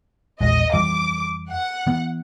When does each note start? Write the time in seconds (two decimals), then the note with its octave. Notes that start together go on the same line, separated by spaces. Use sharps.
0.41 A#1 E2 G#3 D#5
0.73 F2 E3 G3 D6
1.51 F#5
1.87 E3 B3